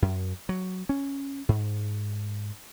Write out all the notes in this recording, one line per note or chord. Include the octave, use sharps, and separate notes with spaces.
F#2
F#3
C#4
G#2